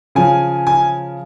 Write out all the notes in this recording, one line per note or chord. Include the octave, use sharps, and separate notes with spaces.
C#3 F3 G#5
G#5